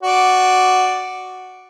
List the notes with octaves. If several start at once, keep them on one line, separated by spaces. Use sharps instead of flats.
F#4 D5